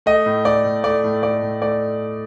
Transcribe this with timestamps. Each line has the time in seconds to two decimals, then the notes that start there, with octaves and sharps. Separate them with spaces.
0.06 A3 D#5
0.26 A2
0.45 A3 D5
0.64 A2
0.84 A3 D5
1.04 A2
1.23 A3 D5
1.42 A2
1.61 A3 D5